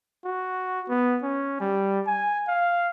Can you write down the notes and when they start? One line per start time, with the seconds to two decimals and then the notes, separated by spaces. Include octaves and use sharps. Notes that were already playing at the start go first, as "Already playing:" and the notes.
0.24 F#4
0.89 B3
1.23 C#4
1.60 G3
2.06 G#5
2.48 F5